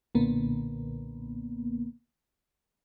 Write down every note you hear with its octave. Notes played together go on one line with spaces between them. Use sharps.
B1 A#2 D3 A#3 B3